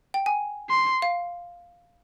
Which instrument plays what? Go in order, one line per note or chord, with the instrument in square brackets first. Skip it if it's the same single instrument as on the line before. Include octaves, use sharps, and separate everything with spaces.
[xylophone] G5
G#5
[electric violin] C6
[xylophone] F5